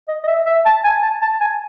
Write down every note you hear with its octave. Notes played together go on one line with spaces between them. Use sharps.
D#5
D#5
E5
E5
A5
G#5
A5
A5
G#5